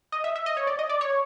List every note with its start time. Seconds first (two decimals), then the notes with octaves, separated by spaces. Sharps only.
0.12 D#5
0.24 E5
0.36 E5
0.46 D#5
0.57 C#5
0.67 D5
0.79 D#5
0.89 D5
1.01 C#5